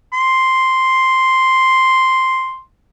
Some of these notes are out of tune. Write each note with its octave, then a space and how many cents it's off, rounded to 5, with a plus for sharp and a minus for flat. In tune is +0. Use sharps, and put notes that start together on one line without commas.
C6 +0